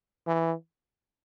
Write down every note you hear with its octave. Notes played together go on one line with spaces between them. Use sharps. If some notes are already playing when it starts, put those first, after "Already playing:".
E3